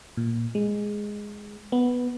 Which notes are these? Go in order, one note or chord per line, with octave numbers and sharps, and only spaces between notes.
A#2
G#3
B3